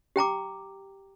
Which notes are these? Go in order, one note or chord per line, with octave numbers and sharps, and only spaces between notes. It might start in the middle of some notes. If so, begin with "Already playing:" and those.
G4 G5 A#5 D6